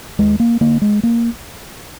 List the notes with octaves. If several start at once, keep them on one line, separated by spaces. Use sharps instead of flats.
D#2 G#3
A#3
D3 A#3
G#3
A#3